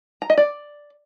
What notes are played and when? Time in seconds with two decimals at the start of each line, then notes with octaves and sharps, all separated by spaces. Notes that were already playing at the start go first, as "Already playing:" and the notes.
0.22 A#5
0.30 D#5
0.38 D5